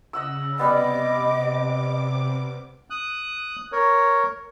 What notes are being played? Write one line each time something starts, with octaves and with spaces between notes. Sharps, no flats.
C#3 D#5 F#5 E6
C3 G3 B3 D#5 D6
D#6 F#6
A#4 C#5